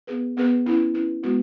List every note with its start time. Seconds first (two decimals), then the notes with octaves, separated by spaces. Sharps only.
0.07 B3 G#4 B4
0.37 B3 G#4 B4
0.66 C#4 E4 B4
0.94 C#4 E4 B4
1.23 G#3 B3 F#4 B4